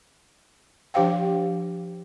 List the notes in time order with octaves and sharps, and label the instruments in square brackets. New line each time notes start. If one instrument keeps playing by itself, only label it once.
[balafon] F3 D4 G4 C5 F5 G5